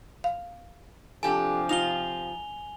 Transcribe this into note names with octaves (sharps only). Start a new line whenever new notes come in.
F5
C3 F3 D4 G4 A4 G#5
D#4 F4 F7 G7